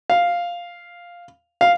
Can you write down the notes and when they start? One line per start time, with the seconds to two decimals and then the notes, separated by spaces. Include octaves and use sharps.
0.10 F5
1.61 F5